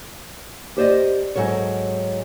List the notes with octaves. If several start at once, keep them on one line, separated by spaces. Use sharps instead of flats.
G4 C5 D5 D#5
G#2 F#3 A4 C#5